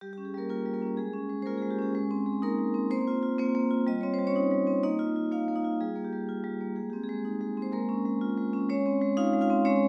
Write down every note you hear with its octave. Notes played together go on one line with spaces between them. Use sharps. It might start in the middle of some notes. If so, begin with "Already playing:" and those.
G3 G4
G4
C#4
G#4
G3 A#3 A#4
A#3 F4 A#4
G3
A#3 A#4
C#4
G#3 G#4
C#4
G#3
C5
A#3 F4 A#4
G#4
G#3
G4
C#4 G#4
G#3
C4
G#3
A#3 D#4 A#4
G#3
C4
A#3 C4 C5
F4
F4
A#3 C4 C5
A#3
F4
G3 D#5
C4 C#5
C5
G3
C#4 C#5
D#4
G3
C4
A#3 D#4 D#5
F4
F4
A#3 F4 F5
A#3
D#4 D#5
F4
G3 G#4
A#3
G4
G3
F4
G3
A#3
G#3 G#4
C4 G4
G#4
G#3
D#4
G#3
C4
C5
G#3 A#3 A#4
C#4
G#3
F4
G#3
C#4
G#3 C#4 C#5
C4
G#3
D#4 F4 F5
G#3
F4 F5
C4
G#3 C#4 C#5